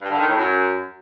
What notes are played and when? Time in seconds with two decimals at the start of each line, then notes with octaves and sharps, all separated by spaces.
0.02 G2
0.11 D3
0.19 D#3
0.28 A2
0.37 F#2